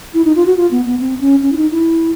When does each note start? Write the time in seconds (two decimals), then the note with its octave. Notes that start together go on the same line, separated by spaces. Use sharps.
0.14 E4
0.25 D#4
0.36 F4
0.46 F#4
0.57 F4
0.71 B3
0.85 B3
1.00 C4
1.21 C#4
1.42 C#4
1.52 E4
1.57 D#4
1.71 E4